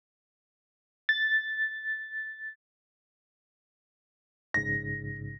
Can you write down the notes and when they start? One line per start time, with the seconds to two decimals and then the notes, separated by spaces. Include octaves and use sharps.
1.09 A6
4.54 A#1 G#2 C#3 A#6